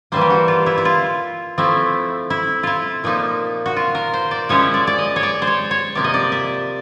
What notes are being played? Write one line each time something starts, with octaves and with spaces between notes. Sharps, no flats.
E3 G3 A#3 C5
G4
F#4
F4
E4
E4
F4
F3 A3 C4 E4
E4
E4 F4
A#2 F3 A#3 D#4
F#4
F4
A#4
C5
D5
F3 G#3 C#4 E4 C#5
D5
D5
D#5
C#5
D5
C5
C#5
C#5
C3 F3 A#3 D5
D#5
D5
E5